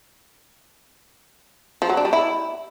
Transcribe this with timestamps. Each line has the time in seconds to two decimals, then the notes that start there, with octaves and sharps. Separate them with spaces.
1.82 F3
1.89 F#3
1.97 D4
2.05 G3
2.13 E4